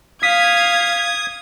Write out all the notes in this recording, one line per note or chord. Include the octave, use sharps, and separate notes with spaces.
F5 D#6 G#6 B6